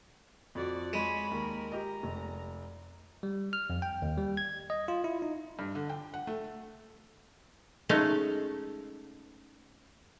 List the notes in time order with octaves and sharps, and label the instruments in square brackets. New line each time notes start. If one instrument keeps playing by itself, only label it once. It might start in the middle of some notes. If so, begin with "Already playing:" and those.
[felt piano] F2 [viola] F#4 D5
[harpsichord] G#3 [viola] C#5 B5
[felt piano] D#2 [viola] A#4
[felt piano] G4 D#5 [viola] A#5
[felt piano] F1
[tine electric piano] G3
F6
F2
G5
D#2
G3
G#6
D#5
F4
E4
D#4
[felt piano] G2
D3
G5
F#5
A3
[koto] G#3 A3 C#4 D#4 F5